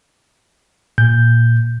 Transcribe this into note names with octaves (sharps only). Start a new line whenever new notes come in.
A#2 G6